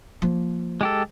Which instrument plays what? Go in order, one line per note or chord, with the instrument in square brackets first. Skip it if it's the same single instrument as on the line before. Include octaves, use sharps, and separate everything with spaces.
[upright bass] F3 A#3
[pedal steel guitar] G#3 G4 A4